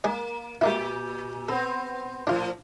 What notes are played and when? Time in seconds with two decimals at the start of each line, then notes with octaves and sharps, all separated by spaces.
0.04 G#3 A#3 G#4 D5
0.61 A#2 G#3 A#3 E4 G4
1.49 B3 C4 A4
2.27 A2 F3 D4 F4